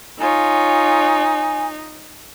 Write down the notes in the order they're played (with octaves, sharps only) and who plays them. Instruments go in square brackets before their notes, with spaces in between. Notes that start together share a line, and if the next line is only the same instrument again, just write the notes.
[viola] D#4 [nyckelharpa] F4 C#5 [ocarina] G#5